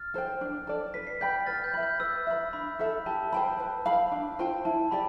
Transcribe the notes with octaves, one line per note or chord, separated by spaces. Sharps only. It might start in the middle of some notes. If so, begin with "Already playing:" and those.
Already playing: F6 A6
A4 C5 G5
D4
A4 D5
B4 B6
C7
D5 G5 B5 G6 B6
B4 F6 A6
G6
E5 B5
G6
B4 E6
E5 B5
D4 B5
A4 E5
G4 A5
C5 G5 B5
B4
F5 B5
D4
F4 C5 G5
E4 A5
G4 D5 B5